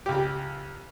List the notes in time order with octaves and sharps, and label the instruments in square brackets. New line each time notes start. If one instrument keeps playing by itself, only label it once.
[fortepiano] C#2 G4